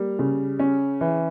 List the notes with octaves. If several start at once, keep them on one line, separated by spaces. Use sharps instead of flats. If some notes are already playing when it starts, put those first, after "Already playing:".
Already playing: G3 A#3
C#3
C#4
E3